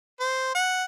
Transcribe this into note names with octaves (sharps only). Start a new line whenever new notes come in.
C5
F#5